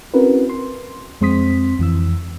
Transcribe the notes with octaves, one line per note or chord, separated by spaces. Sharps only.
C4 C#4 E4 F#4 A#4 B4
C6
F2 G#3 C4 C6 D#6 B6
F2 E3 E6